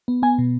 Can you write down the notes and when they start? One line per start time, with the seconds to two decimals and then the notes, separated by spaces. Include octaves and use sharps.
0.08 B3
0.23 B3 G#5
0.38 B2